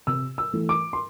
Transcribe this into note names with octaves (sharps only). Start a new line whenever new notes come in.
C3 E6
E6
E3 A3
D6
C6